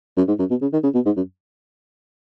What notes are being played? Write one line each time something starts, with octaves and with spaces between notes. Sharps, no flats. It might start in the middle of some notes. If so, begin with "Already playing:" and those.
F#2
G#2
F#2
B2
C#3
D#3
C#3
B2
G#2
F#2